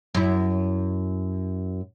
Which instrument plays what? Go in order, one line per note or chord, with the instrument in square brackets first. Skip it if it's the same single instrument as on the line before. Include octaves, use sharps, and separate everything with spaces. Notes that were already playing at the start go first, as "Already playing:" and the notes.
[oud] F#2 E4